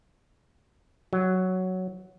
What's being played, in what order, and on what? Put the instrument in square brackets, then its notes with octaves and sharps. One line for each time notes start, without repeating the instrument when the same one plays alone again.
[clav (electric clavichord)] F#3